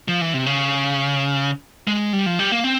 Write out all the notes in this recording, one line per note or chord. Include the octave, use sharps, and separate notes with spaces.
F3
E3
C3
C#3
G#3
G3
F3
G3
A#3
C4